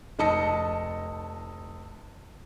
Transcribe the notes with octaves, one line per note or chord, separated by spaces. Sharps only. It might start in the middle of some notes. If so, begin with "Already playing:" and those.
F1 D#4 A5 D#6 A#6 C#7